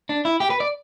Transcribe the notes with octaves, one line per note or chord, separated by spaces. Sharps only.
D4
E4
G4
B4
D5